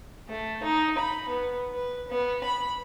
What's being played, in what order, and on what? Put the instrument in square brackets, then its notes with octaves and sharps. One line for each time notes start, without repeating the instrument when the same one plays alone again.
[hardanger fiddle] A3
D#4
B5
B3
B4
B3
B5